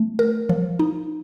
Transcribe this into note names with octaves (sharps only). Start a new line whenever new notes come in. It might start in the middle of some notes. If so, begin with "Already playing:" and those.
Already playing: A3
A#4
F3
D#4